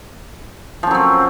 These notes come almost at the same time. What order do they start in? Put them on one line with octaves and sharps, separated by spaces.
F3 C#4 F#3 C4